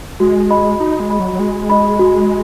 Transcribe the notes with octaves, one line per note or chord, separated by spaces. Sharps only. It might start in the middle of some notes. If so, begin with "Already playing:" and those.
G#3 F#4
D#5 B5
D#4 F#4
G#3
D#5 B5
F#3
F#3
G#3 F#4
D#5 B5
F#4